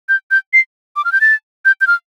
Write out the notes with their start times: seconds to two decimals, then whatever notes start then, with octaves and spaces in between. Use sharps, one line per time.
0.09 G6
0.31 G6
0.53 C7
0.96 D6
1.05 F6
1.12 G6
1.21 A6
1.65 G6
1.81 G6
1.87 F6